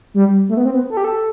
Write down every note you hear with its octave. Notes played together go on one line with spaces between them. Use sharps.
G3
A3
B3
C4
B3
A4
G4
A4